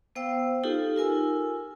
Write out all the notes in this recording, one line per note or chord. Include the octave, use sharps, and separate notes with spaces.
B3 C5 F5 G5 E6
D#4 F4 G4 A4
F4 A#4 G#5 E6